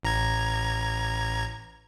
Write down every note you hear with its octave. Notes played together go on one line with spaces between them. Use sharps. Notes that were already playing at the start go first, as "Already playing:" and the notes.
A1 A#5 G#6